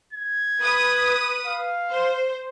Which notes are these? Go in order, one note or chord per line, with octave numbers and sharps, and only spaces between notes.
G#6
B4 D#6
F5
C5